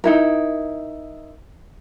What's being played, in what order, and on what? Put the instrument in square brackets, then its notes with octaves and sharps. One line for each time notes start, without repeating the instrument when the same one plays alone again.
[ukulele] D#4 E4 A#4